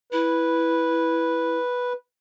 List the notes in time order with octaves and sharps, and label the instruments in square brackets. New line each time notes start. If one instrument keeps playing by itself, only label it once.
[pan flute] E4 [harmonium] B4